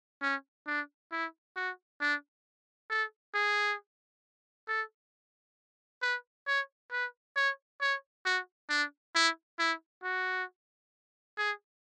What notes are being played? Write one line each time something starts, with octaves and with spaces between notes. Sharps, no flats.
C#4
D4
E4
F#4
D4
A4
G#4
A4
B4
C#5
B4
C#5
C#5
F#4
D4
E4
E4
F#4
G#4